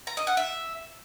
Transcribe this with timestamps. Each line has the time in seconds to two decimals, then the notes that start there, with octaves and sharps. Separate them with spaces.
0.07 A#5
0.17 D#5
0.27 F#5
0.37 E5